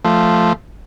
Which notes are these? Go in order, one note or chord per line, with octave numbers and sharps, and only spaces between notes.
F3 A3